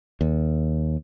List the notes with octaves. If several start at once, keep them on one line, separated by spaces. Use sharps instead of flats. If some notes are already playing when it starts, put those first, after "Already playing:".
D#2